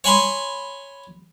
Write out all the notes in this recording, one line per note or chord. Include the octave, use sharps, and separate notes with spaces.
C#5 G#5 B5 C6